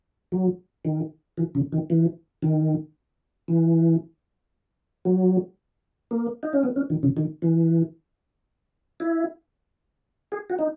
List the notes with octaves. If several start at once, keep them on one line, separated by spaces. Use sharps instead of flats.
F#3
D#3
E3
C#3
D#3
E3
D#3
E3
F#3
A#3
D#4
C#4
B3
C#4
D#3
C#3
D#3
E3
E4
G#4
F#4
D#4